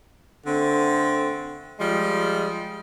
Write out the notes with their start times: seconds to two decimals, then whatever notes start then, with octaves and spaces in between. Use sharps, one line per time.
0.47 D3 A3 C4
1.80 F3 G3 G#3